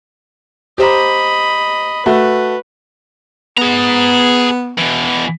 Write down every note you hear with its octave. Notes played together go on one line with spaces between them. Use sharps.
G4 C5 D#5 A#5 B5
A3 F#4 B4
B3 G#4 A#5
B2 E3